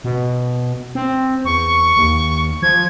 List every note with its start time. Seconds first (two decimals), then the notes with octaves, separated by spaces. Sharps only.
0.04 B2
0.95 C4
1.45 E2 C#6
1.96 D#2
2.62 F3 G#6